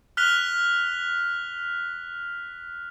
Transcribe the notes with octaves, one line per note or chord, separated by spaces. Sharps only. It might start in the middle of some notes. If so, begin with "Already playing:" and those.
F6 F#6 B6 F7 G7